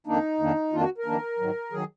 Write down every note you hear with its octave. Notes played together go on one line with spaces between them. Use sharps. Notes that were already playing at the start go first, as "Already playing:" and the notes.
F2 D#3 A#3 D4 D#4
F2 D#3 A#3 D4
F2 D#3 A#3 D4 F4
F#4
A#4
F2 D#3 A#3 D4
G#2 D#3 F#3
D#3 F#3 G#4